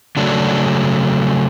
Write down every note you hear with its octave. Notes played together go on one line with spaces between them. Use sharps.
C#3 F#3 A3 C#4 D4